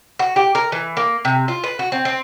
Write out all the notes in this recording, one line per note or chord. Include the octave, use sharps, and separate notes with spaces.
F#4
G4
A#4
E3
A#3
C3
F4
B4
F#4
C4
C4